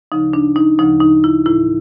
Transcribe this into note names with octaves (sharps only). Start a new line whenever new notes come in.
D2 C#3 F3 D#4
D4
D#4
D2 C#3 F3 D#4
D#4
E4
A2 E3 E4